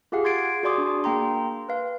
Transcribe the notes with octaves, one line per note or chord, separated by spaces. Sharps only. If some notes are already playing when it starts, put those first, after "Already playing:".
F4 G4 G#4 F5 F#5
C6 G#6 A6 C7 D7
F#4 G#4 D5 C6 D6 D#6
D4
A#3 G5 A#5 C6
B4 F5